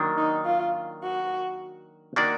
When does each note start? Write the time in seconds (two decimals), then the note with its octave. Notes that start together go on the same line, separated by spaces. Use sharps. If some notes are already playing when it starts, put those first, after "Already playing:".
Already playing: D#3 F#3 A#3 D4
0.17 D#4
0.45 F4
1.03 F#4
2.16 D#3 A#3 D4 F#4 D5